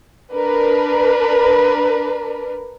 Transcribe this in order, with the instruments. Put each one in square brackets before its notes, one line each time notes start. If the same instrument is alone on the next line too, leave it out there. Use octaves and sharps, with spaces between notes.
[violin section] D4 A#4 B4